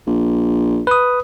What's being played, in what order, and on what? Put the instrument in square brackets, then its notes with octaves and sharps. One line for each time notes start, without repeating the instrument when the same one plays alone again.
[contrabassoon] A#1
[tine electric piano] B4 D#6